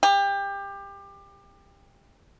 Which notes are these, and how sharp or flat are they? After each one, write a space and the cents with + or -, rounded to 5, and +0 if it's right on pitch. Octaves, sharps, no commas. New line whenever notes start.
G4 +25